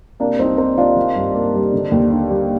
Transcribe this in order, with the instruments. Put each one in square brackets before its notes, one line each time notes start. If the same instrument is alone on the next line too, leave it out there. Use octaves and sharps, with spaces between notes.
[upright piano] C3 [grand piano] A#3 D4
[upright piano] C2 [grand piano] C4 D#4
[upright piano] A#3 [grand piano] C4 D#4
[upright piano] D#3 [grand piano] D4 F4
[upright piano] D#3
G2
A#3
G3
D3
D#2
D4
G3